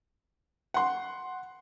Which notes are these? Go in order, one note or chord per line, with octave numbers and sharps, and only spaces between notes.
F#5 C6